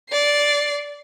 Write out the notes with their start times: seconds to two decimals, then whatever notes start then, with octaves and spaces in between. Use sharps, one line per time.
0.11 D5 C7